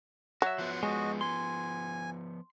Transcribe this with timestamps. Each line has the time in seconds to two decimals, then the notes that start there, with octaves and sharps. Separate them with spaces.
0.42 F#3 F#4 E5
0.58 F3 B3 F#5 C6
0.83 G#3 F#4 D#5
1.21 G#5 C6